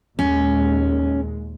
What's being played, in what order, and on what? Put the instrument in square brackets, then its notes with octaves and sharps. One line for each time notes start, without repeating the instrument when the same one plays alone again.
[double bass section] D#2 A#2 G#3 [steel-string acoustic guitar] C#4